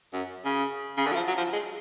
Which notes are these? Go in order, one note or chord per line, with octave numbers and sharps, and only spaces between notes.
F#2
C#3
C#3
D3
F#3
F3
F#3
F3
G#3